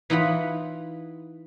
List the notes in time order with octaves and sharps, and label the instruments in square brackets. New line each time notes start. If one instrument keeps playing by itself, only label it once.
[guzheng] E3 D#4 F4 F#5 B5